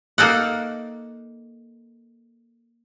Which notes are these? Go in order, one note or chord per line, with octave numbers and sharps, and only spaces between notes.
A#3 D#4 A4 F#5